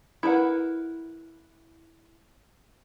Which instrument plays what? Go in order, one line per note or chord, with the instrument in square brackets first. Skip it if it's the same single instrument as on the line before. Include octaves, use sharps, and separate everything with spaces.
[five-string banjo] E4 A#4 B4 F#5